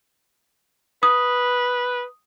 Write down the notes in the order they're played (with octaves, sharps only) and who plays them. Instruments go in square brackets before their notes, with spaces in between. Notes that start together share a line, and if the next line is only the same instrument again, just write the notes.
[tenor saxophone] B4 [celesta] D#6